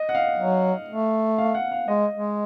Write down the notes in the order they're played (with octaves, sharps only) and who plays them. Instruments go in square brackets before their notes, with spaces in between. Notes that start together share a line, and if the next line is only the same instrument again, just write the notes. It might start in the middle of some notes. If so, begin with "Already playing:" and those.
Already playing: [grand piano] D#5
F#5
F5
[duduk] F#3
A3
[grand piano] F5
F#5
F5
[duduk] G#3 [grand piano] D#5
[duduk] G#3